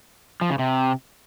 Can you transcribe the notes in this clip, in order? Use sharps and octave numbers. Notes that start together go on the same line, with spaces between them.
F3
C#3
C3